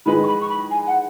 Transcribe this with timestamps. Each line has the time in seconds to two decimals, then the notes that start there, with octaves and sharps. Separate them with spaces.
0.06 D#3 G#3 D#4 B4 B5
0.24 C#6
0.27 B5
0.41 C#6
0.49 B5
0.71 G#5
0.87 F#5